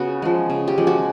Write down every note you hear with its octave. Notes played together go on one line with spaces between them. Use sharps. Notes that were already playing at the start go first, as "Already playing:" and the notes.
Already playing: C#3 B3 F#4
F3 G#3
C#3
G4
F3 G#3
F#4